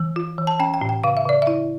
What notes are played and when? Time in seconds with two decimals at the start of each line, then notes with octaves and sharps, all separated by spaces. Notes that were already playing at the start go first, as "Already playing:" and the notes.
Already playing: E3
0.16 F4
0.38 E3
0.47 A5
0.60 C#4 G5
0.74 G5
0.81 A2
0.89 G5
1.04 C#3 F5
1.17 E5
1.25 C#3 D5
1.42 E4 E5